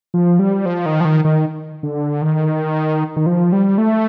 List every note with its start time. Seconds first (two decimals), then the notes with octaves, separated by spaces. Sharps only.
0.14 F3
0.39 G3
0.66 F3
0.86 D#3
1.01 F3
1.05 D#3
1.25 D#3
1.83 D3
2.22 D#3
3.17 D#3
3.26 F3
3.52 G3
3.78 A3